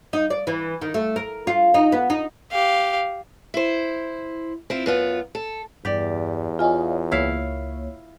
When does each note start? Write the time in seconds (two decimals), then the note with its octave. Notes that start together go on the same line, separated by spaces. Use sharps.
0.13 D#4
0.30 D5
0.47 E3
0.82 D#3
0.94 A3
1.16 A#4
1.47 F4
1.74 D#4
1.92 B3
2.10 D#4
2.51 G4 F5
3.54 E4 C5
4.70 C4 E4 F4
4.86 F#2 B3 F4
5.35 A4
5.85 E2 G2 G4 D5
6.59 F4 C#5 D#5 F5 G#5
7.12 C#2 A#3 E4 C#5 F5